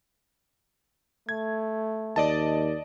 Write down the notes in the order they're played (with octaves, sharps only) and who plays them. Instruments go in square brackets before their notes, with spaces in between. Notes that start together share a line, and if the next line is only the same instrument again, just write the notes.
[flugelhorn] A3 [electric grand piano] G#6
[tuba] D#2 [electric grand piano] D5 D#5 A5